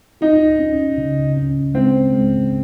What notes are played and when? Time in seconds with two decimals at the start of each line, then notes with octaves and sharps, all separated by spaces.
0.21 D#4 F4
0.59 C#4
0.98 C#3
1.36 C#4
1.74 G#3 C4
2.13 G#3